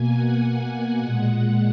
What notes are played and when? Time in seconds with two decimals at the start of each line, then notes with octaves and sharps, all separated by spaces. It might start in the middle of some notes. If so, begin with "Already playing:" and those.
Already playing: B2 A#3 G#5
0.15 F#5
1.01 A#2 G#3